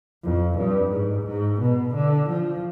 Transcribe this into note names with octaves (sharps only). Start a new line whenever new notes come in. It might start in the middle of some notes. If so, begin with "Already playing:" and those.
F2
G2
G#2
G#2
B2
D3
F3